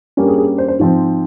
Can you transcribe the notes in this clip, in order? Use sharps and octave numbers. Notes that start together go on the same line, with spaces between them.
G2 G3 A#3 C#4 G4
G#4
G#4
C5
C5
G#2 F3 C4